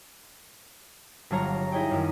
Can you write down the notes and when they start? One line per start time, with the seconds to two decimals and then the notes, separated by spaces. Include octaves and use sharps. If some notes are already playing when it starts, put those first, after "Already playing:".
1.30 G1 F#3 D4 F4 C#5 A#5
1.72 D#4 E4 G#4 C#5 D#5 G5
1.91 F#2 D#3